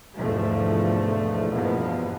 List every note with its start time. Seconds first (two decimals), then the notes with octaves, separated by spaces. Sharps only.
0.16 E2 G#2 B2 D3 F3 A3
1.51 E2 G2 B2 F3 A#3 B3